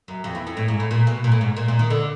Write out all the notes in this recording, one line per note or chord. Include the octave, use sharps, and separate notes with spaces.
F#2
F2
E2
F2
A2
G#2
A2
A#2
B2
A#2
A2
G#2
A#2
A#2
D#3
D3